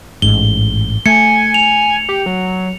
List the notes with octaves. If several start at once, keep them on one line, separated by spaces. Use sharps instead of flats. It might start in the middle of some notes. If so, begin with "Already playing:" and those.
A1 G#2 G7
A3 G#5 C#7
F7
G4
F#3